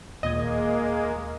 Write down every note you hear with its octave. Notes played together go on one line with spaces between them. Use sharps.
D#2 A#2 G#3 A#3 D#5 G#6